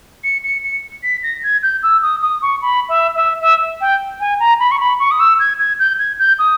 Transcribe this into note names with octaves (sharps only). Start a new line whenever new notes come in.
C#7
C#7
C#7
B6
A#6
G#6
G6
E6
D#6
D#6
C#6
B5
E5
E5
E5
G5
G#5
A#5
B5
C#6
B5
C#6
D#6
E6
G#6
G#6
G6
G#6
G6
D#6